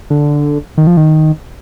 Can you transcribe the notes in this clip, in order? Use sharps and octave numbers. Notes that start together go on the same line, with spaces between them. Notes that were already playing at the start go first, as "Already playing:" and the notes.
D3
D#3
F3
D#3